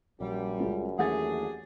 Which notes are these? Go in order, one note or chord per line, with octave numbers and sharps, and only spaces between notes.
A#1 F#2 G3
C#2 F4
D#2 E3 A3 D4 G4 G#4 F#5 A6